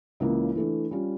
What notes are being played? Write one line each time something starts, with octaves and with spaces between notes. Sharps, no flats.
C#2 C#3 E3 A#3
E3 A3 D4
G3 C#4 F4